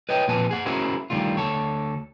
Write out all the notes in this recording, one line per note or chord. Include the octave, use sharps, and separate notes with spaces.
B4 C#5 D#5 G5
A#2 F3 C4 B4 G#5 A5
G#4 F#5
C#4 E4 F#4 G#4 A#4 C5
D2 A2 D#3 G3 A3 F4
D2 A4 C#5